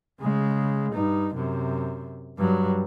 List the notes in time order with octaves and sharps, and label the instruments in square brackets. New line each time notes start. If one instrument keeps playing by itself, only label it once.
[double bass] C#3 G#3
G2 D#4
F#2 C3
G2 F#3